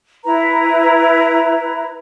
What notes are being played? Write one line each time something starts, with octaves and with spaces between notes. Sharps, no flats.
E4 B4 A#5